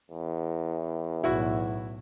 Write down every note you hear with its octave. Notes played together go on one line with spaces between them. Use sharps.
E2
B1 A2 E4 F#4